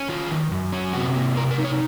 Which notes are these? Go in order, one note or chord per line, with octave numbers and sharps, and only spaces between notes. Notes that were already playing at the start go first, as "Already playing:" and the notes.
Already playing: C#4
D#3 F4
D#3
F#2
C#4
C3 F#4
A#3
C3 A#4
A#4
D#4
C#5